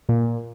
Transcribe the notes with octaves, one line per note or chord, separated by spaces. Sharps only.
A#2